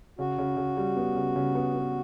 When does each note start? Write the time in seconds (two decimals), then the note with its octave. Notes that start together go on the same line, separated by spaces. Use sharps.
0.19 C#3 F#4
0.38 C#3
0.57 C#3
0.77 G3
0.96 B3
1.16 C#3
1.36 C#3
1.55 B3
1.75 B3